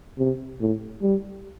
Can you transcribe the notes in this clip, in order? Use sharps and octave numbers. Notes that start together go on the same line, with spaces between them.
C3
A2
G3